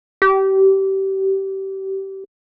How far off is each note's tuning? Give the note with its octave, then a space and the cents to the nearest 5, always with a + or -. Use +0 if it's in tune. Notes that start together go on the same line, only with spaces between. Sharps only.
G4 -25